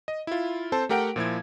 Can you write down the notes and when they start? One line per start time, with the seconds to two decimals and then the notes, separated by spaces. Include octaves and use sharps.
0.08 D#5
0.27 E4 F4
0.72 C4 A4 C5 A5
0.89 A3 G4 A#4 F#5 G5 D7
1.16 A#2 F3 E4 G#6